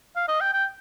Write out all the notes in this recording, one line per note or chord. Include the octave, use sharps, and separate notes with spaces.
F5
D#5
G5
G5